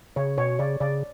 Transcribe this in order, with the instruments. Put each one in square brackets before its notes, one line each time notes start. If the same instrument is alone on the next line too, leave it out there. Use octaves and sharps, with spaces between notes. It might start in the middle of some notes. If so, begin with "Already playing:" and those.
[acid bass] C#3 [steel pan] C#5
[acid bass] B2 [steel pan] C#5
[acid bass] C#3 [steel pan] D5
[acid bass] C#3 [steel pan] D5